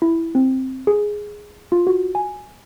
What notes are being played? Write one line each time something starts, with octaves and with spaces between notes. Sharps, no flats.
E4
C4
G#4
F4
F#4
G#5